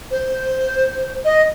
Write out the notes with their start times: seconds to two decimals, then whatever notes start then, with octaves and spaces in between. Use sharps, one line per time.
0.11 C5
1.25 D#5